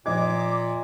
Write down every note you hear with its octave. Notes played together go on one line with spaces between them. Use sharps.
A#2 F3 D#5 D6 G#6